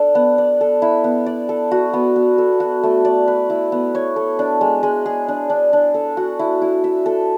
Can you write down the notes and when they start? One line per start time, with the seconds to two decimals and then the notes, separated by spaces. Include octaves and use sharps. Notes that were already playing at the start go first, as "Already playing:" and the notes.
Already playing: D4 A4 D5
0.15 B3
0.38 D5
0.61 A4
0.82 E4
1.04 B3
1.26 D5
1.49 A4
1.71 F#4
1.93 B3
2.16 B3
2.38 A4
2.60 F#4
2.83 A3
3.05 D5
3.27 B4
3.50 E4
3.72 B3
3.95 C#5
4.16 A4
4.39 D4
4.61 G#3
4.83 G#3
5.06 G#4
5.28 D4
5.50 D4
5.73 D4
5.94 A4
6.17 F#4
6.39 E4
6.62 E4
6.84 E5
7.06 A4